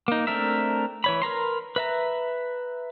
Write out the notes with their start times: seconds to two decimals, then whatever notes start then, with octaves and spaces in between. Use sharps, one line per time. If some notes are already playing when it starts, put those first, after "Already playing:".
0.08 A#3 D#4
0.27 A3 C4 D4 A#4 E5
1.04 E3 C#5 B5
1.22 A#4 B4 A#5 C6
1.76 B4 E5 A#5